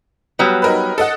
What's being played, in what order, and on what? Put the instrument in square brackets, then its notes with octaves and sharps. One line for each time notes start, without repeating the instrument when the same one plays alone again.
[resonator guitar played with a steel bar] F#3 G3 B3
[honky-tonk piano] D#4 A#4 B4
A4 D#5 F#5